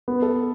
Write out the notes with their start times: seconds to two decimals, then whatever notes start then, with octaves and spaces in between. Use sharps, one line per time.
0.08 B3
0.22 A4